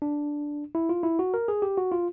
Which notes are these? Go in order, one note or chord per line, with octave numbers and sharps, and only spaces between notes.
D4
E4
F4
E4
F#4
A#4
G#4
G4
F#4
F4